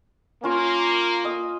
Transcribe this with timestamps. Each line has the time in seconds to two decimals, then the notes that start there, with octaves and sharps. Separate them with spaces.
0.44 A#3 C#4 F4
1.25 D#5 D#6